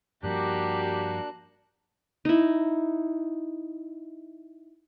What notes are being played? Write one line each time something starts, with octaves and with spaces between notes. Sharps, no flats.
G2 F3 A#3 D4 F#4 G4 F#6
D#4 E4